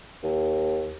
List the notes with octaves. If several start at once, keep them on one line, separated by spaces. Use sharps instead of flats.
D#2